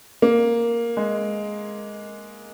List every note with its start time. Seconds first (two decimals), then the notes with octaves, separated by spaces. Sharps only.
0.22 A#3
0.97 G#3